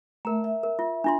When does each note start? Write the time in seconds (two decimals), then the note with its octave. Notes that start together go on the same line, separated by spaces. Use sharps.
0.25 A3 A#4 E5 A#5
0.44 E5
0.63 A#4
0.79 F4
1.04 D4 F4 C6